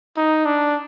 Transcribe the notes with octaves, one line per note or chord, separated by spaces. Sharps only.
D#4
D4